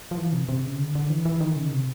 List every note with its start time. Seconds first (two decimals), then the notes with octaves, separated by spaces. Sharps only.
0.11 F3
0.18 E3
0.33 C3
0.49 C3
0.64 C#3
0.79 D3
0.95 D3
1.10 E3
1.25 E3
1.41 D#3
1.56 C#3
1.72 C3